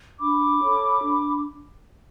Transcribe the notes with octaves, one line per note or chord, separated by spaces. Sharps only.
D4 B5 D6
A4 C#5
D4